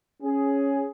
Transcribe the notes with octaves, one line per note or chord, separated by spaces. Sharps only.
C#4 G#4